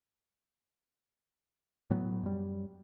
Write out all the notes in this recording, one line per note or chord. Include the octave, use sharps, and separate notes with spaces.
A2 F#3 B3
F#2 G3